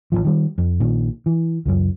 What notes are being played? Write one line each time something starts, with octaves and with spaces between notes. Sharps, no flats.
A1 A2 F3
D#3 G3
F2
A#1 A#2 D#3
E3
C#2 F#2